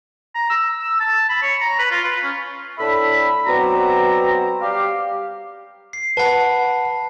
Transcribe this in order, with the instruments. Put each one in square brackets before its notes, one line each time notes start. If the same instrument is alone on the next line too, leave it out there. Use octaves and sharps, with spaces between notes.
[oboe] A#5
E6
E6
A5
B5
C#5
A#5
B4
F4
B4
C#4
[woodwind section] A2 D4 A4 E5 B5
F#3 B3 C4 D5 A#5
G3 G4 F5
[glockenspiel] C7
[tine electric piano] B4 F#5 [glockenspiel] A5 B5